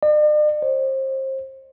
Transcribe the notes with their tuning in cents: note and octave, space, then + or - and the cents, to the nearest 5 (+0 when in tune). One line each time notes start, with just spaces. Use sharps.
D5 +45
C5 +30